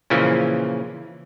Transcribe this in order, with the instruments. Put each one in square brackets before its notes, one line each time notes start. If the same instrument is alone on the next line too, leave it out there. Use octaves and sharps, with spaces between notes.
[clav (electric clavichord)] A#2 C#3 E3 F3